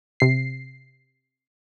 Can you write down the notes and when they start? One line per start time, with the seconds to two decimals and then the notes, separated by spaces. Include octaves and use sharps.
0.20 C3 C7